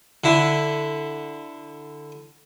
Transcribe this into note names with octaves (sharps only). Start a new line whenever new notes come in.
D3 E4